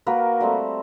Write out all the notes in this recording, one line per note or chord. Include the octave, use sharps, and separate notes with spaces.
A#3 F#4 A#4 B4
G3 A3 C4